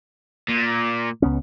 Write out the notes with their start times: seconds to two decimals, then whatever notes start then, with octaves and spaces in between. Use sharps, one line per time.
0.50 A#2
1.22 C#2 B3 C#4